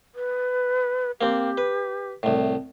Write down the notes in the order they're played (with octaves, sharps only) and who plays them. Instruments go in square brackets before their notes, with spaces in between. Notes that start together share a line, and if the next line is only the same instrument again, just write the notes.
[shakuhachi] B4
[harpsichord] A#3 C4 [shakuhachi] G4
[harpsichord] B4
C2 A2